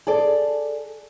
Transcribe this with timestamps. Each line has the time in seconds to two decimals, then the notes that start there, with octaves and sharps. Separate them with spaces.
0.07 G#4 A4 D5